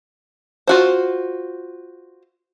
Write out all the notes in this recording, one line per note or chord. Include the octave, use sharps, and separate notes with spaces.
F4 F#4 C5